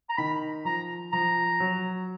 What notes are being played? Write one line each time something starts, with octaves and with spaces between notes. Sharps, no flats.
A#5
D#3 B5
F3 A#5
F3 A#5
F#3